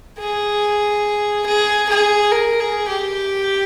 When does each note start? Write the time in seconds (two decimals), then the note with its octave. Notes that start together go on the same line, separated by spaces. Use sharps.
0.19 G#4
1.47 G#4
1.90 G#4
2.32 A#4
2.60 G#4
2.88 G4